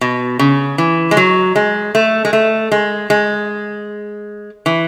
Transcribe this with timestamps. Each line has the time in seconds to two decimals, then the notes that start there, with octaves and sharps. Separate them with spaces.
0.01 B2
0.39 C#3
0.78 E3
1.11 G#3
1.17 F#3
1.56 G#3
1.95 A3
2.25 G#3
2.33 A3
2.72 G#3
3.10 G#3
4.66 E3